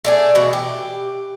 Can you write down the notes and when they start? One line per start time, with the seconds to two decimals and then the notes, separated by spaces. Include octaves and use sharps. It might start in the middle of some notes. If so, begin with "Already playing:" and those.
0.05 A3 D4 G#4
0.35 B2 E3
0.53 G4